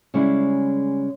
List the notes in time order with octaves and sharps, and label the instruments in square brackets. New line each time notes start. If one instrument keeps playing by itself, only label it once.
[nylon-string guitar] C#3 G3 G#3 C#4 E4